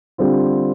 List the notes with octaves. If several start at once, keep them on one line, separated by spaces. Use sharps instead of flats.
D3 G3 C4 F4